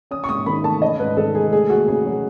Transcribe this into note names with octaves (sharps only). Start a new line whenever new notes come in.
C#4 D#6
C#6
G#2 D#6
D#3 B5
A3 A5
C#4 D#5
G#2 B4
D#3 A4
G#3 G#4
A3 G#4
D#2 F#4
C#3 G#4
F#3